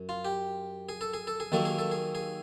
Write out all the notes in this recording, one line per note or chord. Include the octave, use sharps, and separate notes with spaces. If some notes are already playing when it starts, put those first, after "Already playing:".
Already playing: F#2
F4
G4
G#4
A4
G#4
A4
G#4
D#2 D#3 F#3 A#3 A4
G#4
A4
G#4
G#4